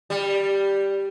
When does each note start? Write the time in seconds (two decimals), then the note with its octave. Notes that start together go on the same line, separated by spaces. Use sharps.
0.10 G3